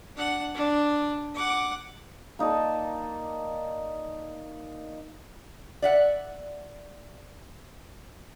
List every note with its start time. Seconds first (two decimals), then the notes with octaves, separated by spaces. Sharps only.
0.15 D4 F#5
0.54 D4
1.34 F#5 D6
2.39 A#3 D#4 D5 A5
5.82 D5 E5 F#5